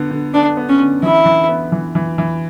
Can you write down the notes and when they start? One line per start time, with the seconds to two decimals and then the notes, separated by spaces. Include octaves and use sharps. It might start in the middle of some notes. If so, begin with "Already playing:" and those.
Already playing: D3 B3
0.11 D3
0.34 B3 D4
0.57 B3
0.69 C#4
0.80 D3
1.02 E3 E4
1.25 E3
1.49 B3
1.72 E3
1.95 E3
2.18 E3